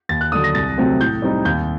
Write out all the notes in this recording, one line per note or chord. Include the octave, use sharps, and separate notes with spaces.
D#2 A6
F#6
D3 F#3 D#6
A#6
C2 A6
C3 F#3 A3 C4
A2 G6
G3 C4 D#4
D#2 G6